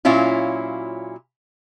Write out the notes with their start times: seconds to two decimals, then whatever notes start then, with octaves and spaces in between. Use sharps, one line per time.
0.05 A#2 F#3 C#4 E4 F4